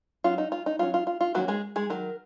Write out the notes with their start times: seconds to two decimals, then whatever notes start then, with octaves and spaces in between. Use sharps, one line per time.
0.24 F#3 C#4 F4
0.38 D#4
0.52 F4
0.66 D#4
0.79 F#3 C#4 F4
0.94 F4
1.07 F4
1.21 F4
1.34 D#3 F#3 A#3 C#4 F#4
1.48 G#3 G#4
1.76 G#3 G#4
1.90 D#3 F#3 A#4